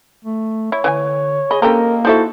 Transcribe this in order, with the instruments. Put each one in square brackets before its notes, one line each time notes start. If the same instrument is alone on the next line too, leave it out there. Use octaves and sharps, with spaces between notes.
[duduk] A3
[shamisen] E4 [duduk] C#5
[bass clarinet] D3 [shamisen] E3 F#4 G#5
[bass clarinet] G#4 [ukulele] D#5 [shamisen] B5
[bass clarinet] A#3 [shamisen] C4 C#4 G4 [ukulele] A4 D#5 A#5 [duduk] A#4
[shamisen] D#4 D5 E5 [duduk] E4 [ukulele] F#4 A4 C5